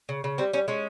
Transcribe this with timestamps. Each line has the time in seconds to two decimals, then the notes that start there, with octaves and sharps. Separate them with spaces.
0.09 C#3
0.24 C#3
0.38 G3 C4
0.53 G3 C#4
0.68 G#3 C#4